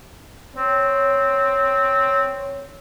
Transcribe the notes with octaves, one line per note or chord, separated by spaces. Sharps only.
C4 C#5